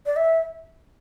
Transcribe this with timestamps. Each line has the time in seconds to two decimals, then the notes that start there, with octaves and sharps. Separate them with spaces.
0.06 D5
0.16 E5